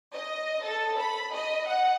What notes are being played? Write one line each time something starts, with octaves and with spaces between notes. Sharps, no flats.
D#5
A4
B5
D#5
F#5